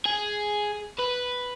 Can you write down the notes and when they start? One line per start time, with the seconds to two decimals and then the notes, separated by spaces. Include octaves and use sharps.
0.06 G#4
0.99 B4